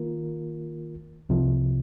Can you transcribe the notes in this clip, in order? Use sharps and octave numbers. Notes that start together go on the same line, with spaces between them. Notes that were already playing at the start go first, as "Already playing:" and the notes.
Already playing: D#3 A#3 F4 A#4
C2 C3 F3